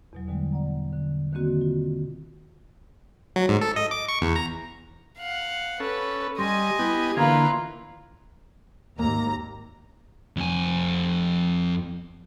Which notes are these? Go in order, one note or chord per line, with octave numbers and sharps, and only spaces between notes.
E2 B2 F#3
B2 D3 G3 G#3 B3
D5 F#5 A#5
D3
B2 D3 D#3 A#3 C4 F#4
F4
F#3
G#2
A4
D#5
D6
C#6
E2
A#5
F5 F#5
C#4 A4 B4
G3 D#5 G#5 C6 A#6
B3 E4 G4
D3 E3 A#3 F4 B4 F5 A#5 G#6
G#1 D#2 A#3 A#5
F2 G#5